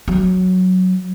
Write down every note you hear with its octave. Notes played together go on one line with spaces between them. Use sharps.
F#3